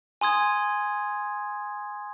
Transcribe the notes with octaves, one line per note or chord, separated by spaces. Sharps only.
G#5 C6 D#6 G#6